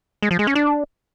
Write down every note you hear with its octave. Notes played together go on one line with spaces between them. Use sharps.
G#3
F3
G#3
C#4
D4